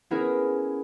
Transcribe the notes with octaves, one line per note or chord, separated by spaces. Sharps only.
B3 C#4 E4 G#4 A#4